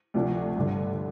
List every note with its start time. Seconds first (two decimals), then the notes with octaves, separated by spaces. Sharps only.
0.14 D2 C3 F3 A3 D4
0.55 G1 G2 D3